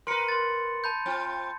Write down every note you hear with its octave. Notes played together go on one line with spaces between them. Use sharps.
A#4 B4 C6 C#7
C6 A6
A5 B5 G6
C4 F4